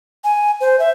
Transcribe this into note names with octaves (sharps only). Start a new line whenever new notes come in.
G#5
C5
E5